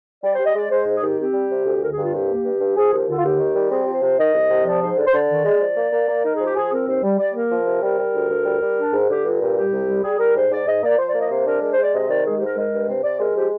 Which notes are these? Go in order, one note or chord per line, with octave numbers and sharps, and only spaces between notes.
G3 D5
G3 C5
D#5
G#3 D5
G#3 C5
G#2 C5
G#4
D#3 G4
C4 G4
G3
C3
D2
D3 A#4
G#4
G2
F4
C2 G4
A#3
G2
G2
F3 G#4
D#2 G4
D3 F4
F4
D#2 G4
D#3
G3
C4 G#4
G4
F3
C5
C3 C5
D#3 D#5
C2
C3
F3 D5
G#2 C5
D3 D5
C5
D3 D5
D#3
G#3
F3
A#3
A#3
A#3
D#4 A#4
F3 G#4
G4
F3 G#4
C4 A#4
D#2 C5
G3
G3 D5
A#3 A#4
F3
C3
G3 A#4
G3
D2
D2
G3
G3
D4
G#2
D3 G4
G2 F4
A#2 G4
G3 G4
C2
G3
G3 G#4
G3 A#4
G#2 C5
G#2 D5
G#2 D#5
A#3 D5
F3 C5
D5
A#3
D#5
C3 C5
D4 A#4
G#3 A#4
C5
G#3 D5
C3 D#5
D#3 D5
G#3 G#4
G4
G#2
A#4
G#3 A#4
G2
C3 C5
C3 D5
G#3 A#4
F3 G4